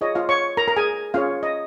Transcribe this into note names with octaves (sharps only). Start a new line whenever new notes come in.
F4 G#4 C#5 D#5
F4 F5
C#5 C#6
A#4 A#5
A#4 A#5
G#4 G#5
C#4 F4 G#4 C#5 F5
D#5